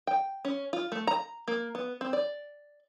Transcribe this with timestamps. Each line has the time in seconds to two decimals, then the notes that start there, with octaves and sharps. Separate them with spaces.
0.07 G5
0.45 C#4
0.73 F4
0.92 A3
1.07 A#5
1.48 A#3
1.75 B3
2.01 C4
2.13 D5